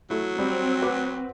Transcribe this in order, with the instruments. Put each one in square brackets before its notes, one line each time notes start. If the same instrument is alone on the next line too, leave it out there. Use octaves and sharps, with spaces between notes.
[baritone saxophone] F#3 [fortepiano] A3 E4
[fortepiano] G3 [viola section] C4
[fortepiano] F#4 B4 D6